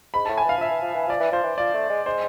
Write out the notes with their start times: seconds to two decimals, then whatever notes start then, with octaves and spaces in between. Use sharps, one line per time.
0.14 G#2 B5
0.25 A5
0.29 A2
0.38 G#5
0.45 E3 F5
0.58 F3 E5
0.70 E3
0.82 F3
0.95 E3
1.07 F3 D5
1.20 E3
1.32 F3 C5
1.43 E3
1.58 F3 D5
1.74 A3
1.90 G#3
2.06 G#3 C5